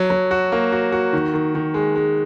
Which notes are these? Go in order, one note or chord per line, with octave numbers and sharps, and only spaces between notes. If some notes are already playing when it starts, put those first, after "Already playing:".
Already playing: F#3
F#3
F#4
A#3
F#4
F#4
D#3
D#3
D#3
G#3
G#3